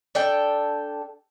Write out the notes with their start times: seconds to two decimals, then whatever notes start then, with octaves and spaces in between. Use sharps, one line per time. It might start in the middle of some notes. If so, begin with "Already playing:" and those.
0.15 D4 A4 G5